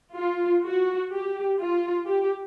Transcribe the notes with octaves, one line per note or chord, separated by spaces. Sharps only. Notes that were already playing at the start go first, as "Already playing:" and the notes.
F4
F#4
G4
F4
G4